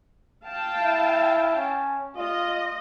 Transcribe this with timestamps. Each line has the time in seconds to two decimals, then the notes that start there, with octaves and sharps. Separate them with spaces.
0.45 F5 G5 A5
0.79 E4
1.57 C#4
2.17 F4 D#5